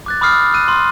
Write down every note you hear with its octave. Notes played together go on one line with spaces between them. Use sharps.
D6 F#6 A6
B5 D6 D#6 F6 C7
E6
E6 F#6 D#7
C6